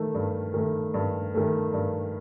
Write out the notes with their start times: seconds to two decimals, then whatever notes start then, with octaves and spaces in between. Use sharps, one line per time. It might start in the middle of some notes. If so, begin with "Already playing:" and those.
Already playing: D#3 A3
0.15 G2
0.54 D#3 A3
0.94 G2
1.34 D#3 A3
1.74 G2